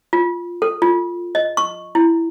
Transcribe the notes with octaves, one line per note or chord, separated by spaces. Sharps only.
F4
A4
F4
D#5
C#6
E4